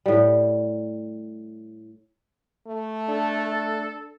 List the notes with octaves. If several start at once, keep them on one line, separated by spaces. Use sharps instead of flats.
A2 G3
A3
D4 A4